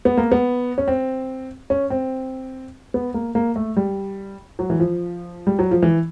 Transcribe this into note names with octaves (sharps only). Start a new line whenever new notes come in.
B3
A#3
B3
C#4
C4
C#4
C4
B3
A#3
A#3
A3
G3
F#3
E3
F3
G3
F#3
F3
E3